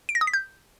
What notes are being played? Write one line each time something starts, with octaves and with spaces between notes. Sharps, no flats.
D7
A#6
D#6
B6
G6